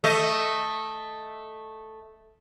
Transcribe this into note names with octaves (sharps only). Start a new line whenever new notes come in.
A3 D#5